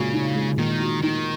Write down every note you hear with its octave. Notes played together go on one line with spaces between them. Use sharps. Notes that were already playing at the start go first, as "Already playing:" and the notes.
Already playing: A#2 C#3 G#3 F#4
D#4
G#3
A#2 D#3
F#4
D#3 D#4